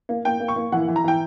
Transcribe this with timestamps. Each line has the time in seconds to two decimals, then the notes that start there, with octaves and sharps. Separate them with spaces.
0.09 A#3
0.25 A#3 G5
0.40 A#3
0.48 C#6
0.56 A#3
0.72 E3 F#5
0.88 E3
0.96 A#5
1.04 E3 G5